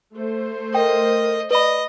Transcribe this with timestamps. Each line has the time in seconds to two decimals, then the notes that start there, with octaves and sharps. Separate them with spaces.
0.17 A3 C5
0.75 A#4 D#5 G5
1.51 B4 D5 D#5 B5